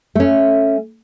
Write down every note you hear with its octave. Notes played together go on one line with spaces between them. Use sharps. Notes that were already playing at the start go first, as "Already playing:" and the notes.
A3 C#4